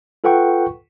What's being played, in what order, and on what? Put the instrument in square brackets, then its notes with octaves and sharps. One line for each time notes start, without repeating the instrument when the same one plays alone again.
[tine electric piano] F4 A4 B4 F#5 G5 C#6